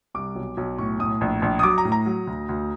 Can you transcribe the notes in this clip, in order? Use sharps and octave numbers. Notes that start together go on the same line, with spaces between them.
C2 D6
B1
B1
A2 C#6
A2 D#6
A#1
A#1
D#6
F#3 D6
A#5
A2
A#5
F#3
D2
D2